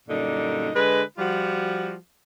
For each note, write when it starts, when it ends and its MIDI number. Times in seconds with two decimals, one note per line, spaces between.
0.08 0.69 42
0.08 0.69 46
0.08 0.69 50
0.08 0.69 55
0.08 0.69 63
0.75 1.02 50
0.75 1.02 56
0.75 1.02 71
1.18 1.94 53
1.18 1.94 55
1.18 1.94 65
1.18 1.94 66